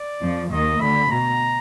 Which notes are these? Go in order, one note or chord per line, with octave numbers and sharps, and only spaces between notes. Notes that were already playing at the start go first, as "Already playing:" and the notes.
Already playing: D5
F2 F3
D#2 D#3 D#5
D2 D3 B5
B2 A#5